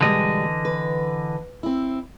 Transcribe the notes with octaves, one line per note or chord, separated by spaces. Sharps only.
B2 D3 E3 G3 G#3 D#5
B4
C4 E4